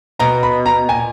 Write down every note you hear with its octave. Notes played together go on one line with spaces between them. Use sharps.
B2 A#5
B5
A#5
A#2 G#5